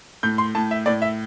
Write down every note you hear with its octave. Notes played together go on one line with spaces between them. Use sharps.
A2 G6
C6
A2 A5
E5
A2 D5
E5